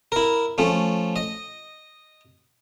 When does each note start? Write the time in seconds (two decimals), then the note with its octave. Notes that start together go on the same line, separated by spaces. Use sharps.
0.12 E4 A#4
0.58 F3 A3 C#4
1.16 D#5